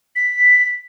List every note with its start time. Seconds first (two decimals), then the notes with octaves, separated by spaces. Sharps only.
0.16 B6